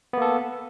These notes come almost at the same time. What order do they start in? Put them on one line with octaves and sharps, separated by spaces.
B3 A#3 A4